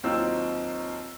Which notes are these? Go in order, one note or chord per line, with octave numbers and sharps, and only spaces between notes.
D#2 F#3 C4 D#4 F4 E6